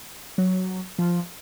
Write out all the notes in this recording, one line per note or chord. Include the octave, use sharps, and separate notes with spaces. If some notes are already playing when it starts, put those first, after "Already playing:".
F#3
F3